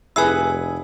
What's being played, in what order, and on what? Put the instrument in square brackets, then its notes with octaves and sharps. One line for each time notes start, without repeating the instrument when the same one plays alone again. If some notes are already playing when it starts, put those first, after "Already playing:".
[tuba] F1 [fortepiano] E4 G#4 B4 [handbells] G#5 E6